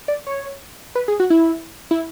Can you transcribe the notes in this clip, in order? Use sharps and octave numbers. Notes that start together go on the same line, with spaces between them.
D5
C#5
B4
G#4
F#4
E4
E4